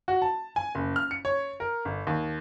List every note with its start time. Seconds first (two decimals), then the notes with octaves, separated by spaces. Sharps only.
0.08 F#4
0.22 A5
0.56 G#5
0.75 F#1
0.96 F6
1.11 C#7
1.25 C#5
1.60 A#4
1.85 G1
2.07 D#2